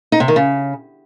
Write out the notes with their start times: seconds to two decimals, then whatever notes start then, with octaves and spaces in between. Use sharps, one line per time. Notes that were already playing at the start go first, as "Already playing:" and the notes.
0.12 D#4
0.20 C3
0.28 D#3
0.36 C#3